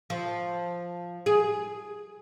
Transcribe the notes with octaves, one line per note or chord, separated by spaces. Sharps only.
F3
G#4